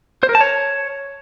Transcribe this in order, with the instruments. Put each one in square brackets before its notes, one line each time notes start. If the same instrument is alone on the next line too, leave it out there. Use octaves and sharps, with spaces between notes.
[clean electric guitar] C5
A#4
A5
C#5